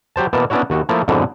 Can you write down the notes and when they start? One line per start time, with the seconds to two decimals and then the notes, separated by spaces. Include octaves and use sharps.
0.16 F#3 G4 C5 A5
0.33 B2 E3 A#3 A5
0.50 B3 C#4 D4 E4 F#4 C#5
0.70 D#2 F#4
0.89 F3 A3 A#3 E4 F4
1.08 F2 G#2 B2 D3 E3 F#3